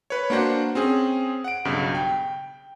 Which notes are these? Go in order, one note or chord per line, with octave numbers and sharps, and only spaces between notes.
B4 C#5
A#3 D4 F#4 C5 F#5
C4 C#4 G#4
F#5 D7
B1 G2 C#3
G5